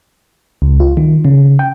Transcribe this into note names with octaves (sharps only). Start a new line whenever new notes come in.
C#2
F4
D#3
C#3
G5